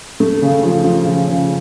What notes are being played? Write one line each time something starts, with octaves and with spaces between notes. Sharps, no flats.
A3
C#3
F3
F3
C#3
C#3